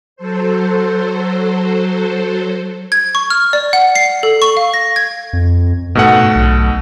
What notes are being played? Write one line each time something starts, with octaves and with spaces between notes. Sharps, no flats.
F#3 A4 C5
G#6
C#6
F6
D5
F#5
C7
A4
C#6
F5
A#6
G#6
F2
G#2 B2 A3 F#5
B1